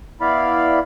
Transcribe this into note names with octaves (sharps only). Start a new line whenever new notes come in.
B3 E4 D5 F5 B5